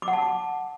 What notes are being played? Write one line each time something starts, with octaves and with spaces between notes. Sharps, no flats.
D6
F#5
A5